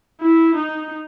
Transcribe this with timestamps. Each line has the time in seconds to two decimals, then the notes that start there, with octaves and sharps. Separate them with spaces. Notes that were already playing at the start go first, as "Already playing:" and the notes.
0.21 E4
0.55 D#4